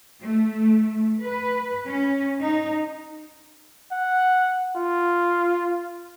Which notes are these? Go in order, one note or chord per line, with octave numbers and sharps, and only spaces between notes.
A3
B4
C#4
D#4
F#5
F4